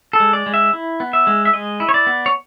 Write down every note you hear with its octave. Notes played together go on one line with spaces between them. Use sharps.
A4
G#3
D5
G#3
E5
E4
B3
E5
G#3
E5
G#3 D#5
E4
C#5
D5
B3
C#5